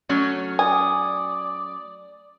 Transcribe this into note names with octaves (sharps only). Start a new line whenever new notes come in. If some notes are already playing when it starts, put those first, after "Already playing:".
F#3 A3 C#4
D5 G#5 D#6